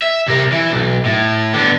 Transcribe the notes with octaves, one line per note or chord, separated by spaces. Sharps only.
E5
C3 A#4
E3
B1
A2
D3 B3